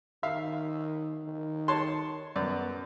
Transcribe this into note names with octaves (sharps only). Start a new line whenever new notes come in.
D#3 E5 F5
D#3
C#5 A5 C6
F#2 B3 D5